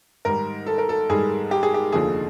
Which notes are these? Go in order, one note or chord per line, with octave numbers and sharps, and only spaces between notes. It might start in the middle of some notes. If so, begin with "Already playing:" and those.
G#2 D#3 G3 A#4
A4
A#4
A4
G#2 D#3 G3 G#4
G4
G#4
G4
F1 D#2 D3 F3 G#4